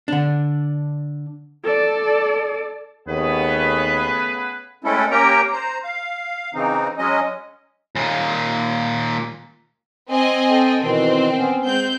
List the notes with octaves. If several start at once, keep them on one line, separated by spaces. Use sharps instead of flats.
D3 D4
A4 D5
D#2 C#3 A3 B3 G#4 B4
G#3 A3 C4 C#4 E4 A4
A#3 C#4 G4 A#4 G5 A#5
C5 A#5
F5
C#3 E3 C4 D#4
F#3 G#3 C#4 D#5
D#2 A#2
C4 D#5 G#5
A4 G5
B2 D#3 E3 C4 C5
B3 C#4
G#3 C4 G6